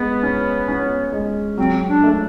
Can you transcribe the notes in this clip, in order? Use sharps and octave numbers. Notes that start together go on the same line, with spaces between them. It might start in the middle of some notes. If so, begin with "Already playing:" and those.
Already playing: G#3 B3
C#4
C#4
G#3
F#3 C4
D4
A3